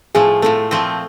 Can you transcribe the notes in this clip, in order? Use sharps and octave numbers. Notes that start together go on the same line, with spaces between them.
A2 F3 A3 G#4
A2 F3 A3 A4
A#2 F3 A3 C4